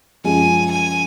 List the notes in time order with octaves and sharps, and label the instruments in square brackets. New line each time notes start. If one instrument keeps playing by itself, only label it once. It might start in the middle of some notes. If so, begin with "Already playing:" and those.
[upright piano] F#2 F3 G#3 [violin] G#5
[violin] G#5